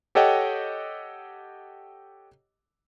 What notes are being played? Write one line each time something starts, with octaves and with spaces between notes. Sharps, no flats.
G4 A4 C#5 D#5 F#5 G5